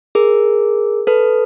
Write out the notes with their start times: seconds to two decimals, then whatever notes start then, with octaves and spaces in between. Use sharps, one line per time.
0.15 G#4 A#4
1.07 A4 B4